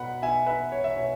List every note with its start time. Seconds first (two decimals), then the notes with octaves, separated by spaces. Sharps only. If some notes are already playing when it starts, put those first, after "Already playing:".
Already playing: B2 B3 F#5 B5
0.22 B2 E5 G#5
0.46 B4 E5
0.59 B3
0.72 C#5
0.84 E5
0.96 B2 C#5